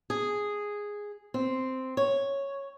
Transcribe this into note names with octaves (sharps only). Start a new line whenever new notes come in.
G#4
C4
C#5